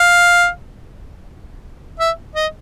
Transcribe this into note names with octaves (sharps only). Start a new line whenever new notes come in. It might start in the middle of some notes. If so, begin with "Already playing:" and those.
Already playing: F5
E5
D#5